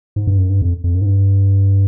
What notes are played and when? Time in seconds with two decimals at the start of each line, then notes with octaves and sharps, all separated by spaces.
0.16 G#2
0.27 G2
0.38 F#2
0.50 G2
0.62 F2
0.84 F2
0.95 F#2
1.01 G#2
1.06 G2